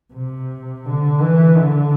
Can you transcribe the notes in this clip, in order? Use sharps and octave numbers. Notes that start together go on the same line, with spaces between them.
C3
D3
E3
D3